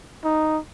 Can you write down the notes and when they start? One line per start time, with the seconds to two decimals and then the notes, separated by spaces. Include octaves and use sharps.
0.24 D#4